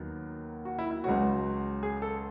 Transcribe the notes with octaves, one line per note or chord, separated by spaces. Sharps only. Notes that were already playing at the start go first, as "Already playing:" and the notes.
Already playing: D#2 D#3 F#3 B3
F#4
E4
E4
C#2 C#3 F#3 F#4
G#4
A4